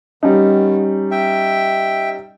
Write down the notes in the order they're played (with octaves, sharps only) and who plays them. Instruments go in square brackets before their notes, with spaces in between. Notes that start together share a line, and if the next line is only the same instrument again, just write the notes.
[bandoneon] D#3 B3 [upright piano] G3 C#4 D#4
[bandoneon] E5 G5